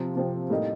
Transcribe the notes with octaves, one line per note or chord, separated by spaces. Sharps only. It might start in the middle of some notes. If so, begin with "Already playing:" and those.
Already playing: C3 F3 C4
C3 F3 C4
A2 G3 A#3 D#4